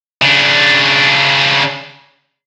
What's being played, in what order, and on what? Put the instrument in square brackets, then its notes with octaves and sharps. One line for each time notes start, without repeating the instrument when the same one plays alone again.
[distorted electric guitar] C#3 D4